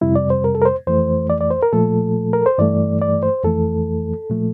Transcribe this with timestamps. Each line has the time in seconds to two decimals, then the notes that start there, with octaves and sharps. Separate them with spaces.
0.01 F2 C3 G3 E4
0.16 D5
0.30 C5
0.44 A#4
0.55 A4
0.62 A#4
0.65 C5
0.86 F2 E3 A3 C5
1.30 D5
1.41 D5
1.51 C5
1.62 A#4
1.73 A#2 F3 A3 A4
2.33 A#4
2.46 C5
2.58 G2 E3 A3 D5
3.02 D5
3.23 C5
3.44 F2 E3 A3 A4
4.30 A#2 F3 A3